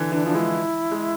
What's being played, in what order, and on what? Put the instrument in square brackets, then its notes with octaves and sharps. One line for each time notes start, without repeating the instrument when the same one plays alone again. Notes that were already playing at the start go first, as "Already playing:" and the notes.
Already playing: [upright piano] D3 E3
[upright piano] E3 [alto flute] D4
[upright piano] F3 [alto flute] D4
[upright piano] G#3 [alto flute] E4
[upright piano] G#3